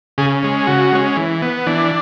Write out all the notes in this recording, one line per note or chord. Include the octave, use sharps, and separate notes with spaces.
C#3 G#4
G#3 C#4
C#3 F#4
G#3 C#4
E3
B3
E3 D4